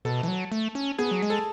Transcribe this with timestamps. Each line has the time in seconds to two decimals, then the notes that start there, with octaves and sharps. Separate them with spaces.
0.05 B2 A4
0.23 E3
0.28 F#3
0.52 A3
0.75 C#4
0.98 B3 G#4
1.11 F#3
1.22 G#3
1.30 A4